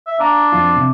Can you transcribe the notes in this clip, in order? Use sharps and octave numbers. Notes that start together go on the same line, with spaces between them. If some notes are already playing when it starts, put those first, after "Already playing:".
E5
D4 F5 A#5
F2 F4
C3